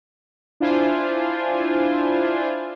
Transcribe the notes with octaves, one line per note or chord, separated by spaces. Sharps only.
D4 E4 F4 C5 G#5